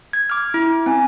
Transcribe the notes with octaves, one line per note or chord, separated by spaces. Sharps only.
G#6
D6 F6
E4
C4 G#5